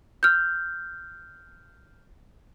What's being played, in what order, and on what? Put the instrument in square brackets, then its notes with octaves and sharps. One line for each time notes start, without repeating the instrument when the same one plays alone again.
[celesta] F6 G6